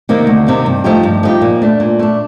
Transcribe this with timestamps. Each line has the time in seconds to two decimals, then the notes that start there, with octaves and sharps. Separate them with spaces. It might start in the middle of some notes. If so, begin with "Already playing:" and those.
0.09 C3 D#3 A#3
0.27 D2
0.46 C3 D#3 A#3
0.66 G2
0.84 F3 A3 D#4 G4
1.03 G2
1.23 F3 A3 D#4 G4
1.42 A#2
1.62 A3 D4
1.80 A#2
1.99 A3 D4